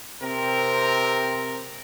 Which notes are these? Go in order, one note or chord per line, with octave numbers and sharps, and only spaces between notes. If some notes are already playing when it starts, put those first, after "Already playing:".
C3 C4 A#4